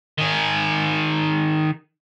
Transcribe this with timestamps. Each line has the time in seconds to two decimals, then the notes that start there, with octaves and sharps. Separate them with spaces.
0.18 D#3 G#4